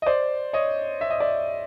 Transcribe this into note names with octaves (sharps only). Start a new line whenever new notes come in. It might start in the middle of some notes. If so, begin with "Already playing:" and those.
D#5
C5 D5
C#5 D#5
E5
D#5
D5 E5